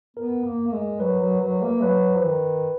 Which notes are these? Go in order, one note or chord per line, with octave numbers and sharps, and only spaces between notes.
B3 A#4
A#3
A#3
G#3
F#3 B4
F#3
F#3
A#3
F#3 B4
F3
D#3